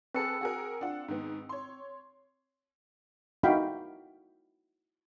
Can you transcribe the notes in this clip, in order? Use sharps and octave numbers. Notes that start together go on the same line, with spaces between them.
C4 G#4 A4 B4 E6 C#7
F#4 G#4 A#4
D4 F4 F#5
G#2 D#3 B3
C#5 C6
D#4 E4 F#4 F5 G5 B5